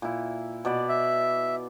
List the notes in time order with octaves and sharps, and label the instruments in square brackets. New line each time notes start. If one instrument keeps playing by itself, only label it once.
[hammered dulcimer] A#2 E4
B2 D5 B5
[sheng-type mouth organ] E5